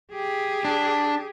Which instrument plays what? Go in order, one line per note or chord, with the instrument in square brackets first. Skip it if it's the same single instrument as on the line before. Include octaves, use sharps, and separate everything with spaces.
[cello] G4 G#4
[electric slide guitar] D4